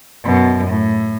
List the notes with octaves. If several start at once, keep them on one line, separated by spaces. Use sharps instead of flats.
F#2 B2
A2